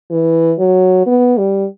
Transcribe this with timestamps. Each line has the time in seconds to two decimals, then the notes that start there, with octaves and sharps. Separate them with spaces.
0.11 E3
0.59 F#3
1.06 B3
1.38 G3